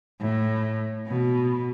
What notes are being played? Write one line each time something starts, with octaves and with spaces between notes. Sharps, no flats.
A2
B2